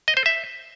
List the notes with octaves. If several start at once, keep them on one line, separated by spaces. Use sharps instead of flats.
D#5
C5
E5